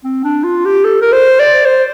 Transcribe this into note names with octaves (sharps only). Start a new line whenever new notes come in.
C4
D4
F4
G4
A4
A#4
C5
D5
C5